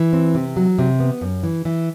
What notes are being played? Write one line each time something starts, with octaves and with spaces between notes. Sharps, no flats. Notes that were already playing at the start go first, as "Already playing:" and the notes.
Already playing: E3
C4
C3
F#3
C3
B3
F#2
E3
E3